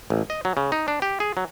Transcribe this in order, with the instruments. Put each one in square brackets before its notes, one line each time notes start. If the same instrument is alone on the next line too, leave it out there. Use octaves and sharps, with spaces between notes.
[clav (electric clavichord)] A1
D#5
F#3
C#3
D#4
D4
G4
G#4
F#3